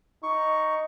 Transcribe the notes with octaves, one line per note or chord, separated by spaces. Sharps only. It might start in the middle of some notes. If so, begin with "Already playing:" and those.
D#4 C#6